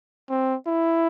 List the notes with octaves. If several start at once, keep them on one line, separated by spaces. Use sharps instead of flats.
C4
E4